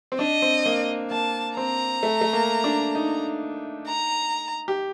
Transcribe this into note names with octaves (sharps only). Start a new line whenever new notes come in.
C4
D4 D#5
C4
A#3
A#3 A5
C4 A#5
A3
A3
A#3
D4
D#4
A#5
G4